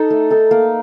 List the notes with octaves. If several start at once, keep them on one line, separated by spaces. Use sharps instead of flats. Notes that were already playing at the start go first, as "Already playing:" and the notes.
Already playing: D#4 A4
A3
D#4 A4
A#3